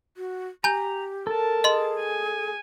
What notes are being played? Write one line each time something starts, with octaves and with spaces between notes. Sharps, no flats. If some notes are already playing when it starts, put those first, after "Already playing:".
F#4
G4 G#5 A#5 G6
A4 A#4 A5
G#4 D#5 C6
G#5